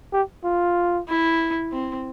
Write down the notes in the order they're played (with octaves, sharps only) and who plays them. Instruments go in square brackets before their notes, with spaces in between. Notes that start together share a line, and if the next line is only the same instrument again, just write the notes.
[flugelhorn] G4
F4
[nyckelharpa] E4
C4